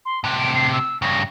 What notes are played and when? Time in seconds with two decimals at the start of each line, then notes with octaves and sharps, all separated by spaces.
0.05 C6
0.24 A2 C3 F#6
0.39 D7
0.54 C7
0.73 E6
1.02 G2 C#3 A#6